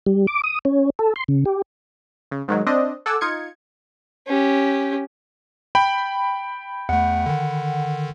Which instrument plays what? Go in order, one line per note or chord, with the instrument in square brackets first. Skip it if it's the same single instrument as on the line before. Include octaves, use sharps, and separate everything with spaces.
[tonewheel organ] G3
D6
D#6
C#4
A4
C6
C#3
G4
[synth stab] C#3
G#2 D#3 F#3
C4 D4 D#5
A4 F#5 G#5 D6 E6
D#4 F4 G#6 C#7
[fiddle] C#4 G4
[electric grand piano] G5 B5
[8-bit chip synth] E2 A3 [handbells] F#5
[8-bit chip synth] D3 D#3